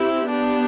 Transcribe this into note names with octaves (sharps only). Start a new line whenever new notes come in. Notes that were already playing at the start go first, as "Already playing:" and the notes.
Already playing: C4 E4 G4
B3 D4 G4